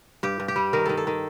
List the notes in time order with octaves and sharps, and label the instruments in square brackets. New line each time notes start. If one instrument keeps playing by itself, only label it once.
[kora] G2 G4
G2
G4
G3
D#3 A#4
D#3 A4
A4
D#3